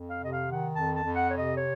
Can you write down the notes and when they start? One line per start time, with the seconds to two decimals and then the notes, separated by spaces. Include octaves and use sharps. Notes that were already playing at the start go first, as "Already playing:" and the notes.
Already playing: F2
0.10 F5
0.17 C3
0.24 D#5
0.32 F5
0.46 D#3
0.52 F#5
0.74 F2 A5
0.95 A5
1.02 F2
1.16 F#5
1.30 C3 C#5
1.37 D#5
1.58 C#5